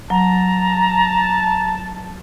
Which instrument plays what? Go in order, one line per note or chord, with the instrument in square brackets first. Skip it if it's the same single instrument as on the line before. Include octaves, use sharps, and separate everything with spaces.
[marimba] F#3 [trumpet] A5 [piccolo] A#5